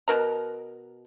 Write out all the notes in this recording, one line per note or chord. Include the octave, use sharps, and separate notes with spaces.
B2 A#4 A#5